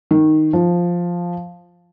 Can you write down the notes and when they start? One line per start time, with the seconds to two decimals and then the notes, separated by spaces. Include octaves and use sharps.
0.11 D#3
0.53 F3